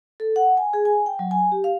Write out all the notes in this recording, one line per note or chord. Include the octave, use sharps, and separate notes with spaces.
A4
F#5
G#5
G#4
G#5
G5
F#3
G#5
G4
F5